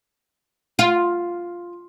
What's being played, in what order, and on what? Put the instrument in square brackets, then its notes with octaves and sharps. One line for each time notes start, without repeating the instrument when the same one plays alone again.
[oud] F4